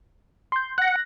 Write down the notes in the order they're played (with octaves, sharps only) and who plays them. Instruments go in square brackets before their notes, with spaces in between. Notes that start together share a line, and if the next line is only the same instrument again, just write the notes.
[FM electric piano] C6 G6
[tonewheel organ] F#5 [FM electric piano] F#6 A#6